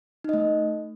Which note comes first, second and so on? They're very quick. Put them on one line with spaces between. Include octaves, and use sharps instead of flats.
D#4 D#5 A3